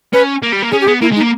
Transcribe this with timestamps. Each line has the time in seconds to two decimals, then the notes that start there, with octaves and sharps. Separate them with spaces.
0.13 C#4 B4
0.43 A#3
0.53 G3
0.63 A#3
0.71 C#4 G#4
0.81 G4
0.87 B3 G#4
1.01 A#3 E4
1.12 G#3
1.16 D#4
1.21 A#3